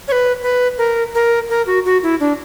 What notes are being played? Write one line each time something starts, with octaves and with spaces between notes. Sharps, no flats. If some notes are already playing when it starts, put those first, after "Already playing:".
C#5
B4
B4
A#4
A#4
A#4
F#4
F#4
E4
D4